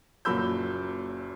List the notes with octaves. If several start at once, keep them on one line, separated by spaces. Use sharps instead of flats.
F#1 A#2 F#3 B5 E6 G6